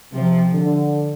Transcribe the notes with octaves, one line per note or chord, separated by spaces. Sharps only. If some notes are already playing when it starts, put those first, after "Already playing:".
C3 F3
D3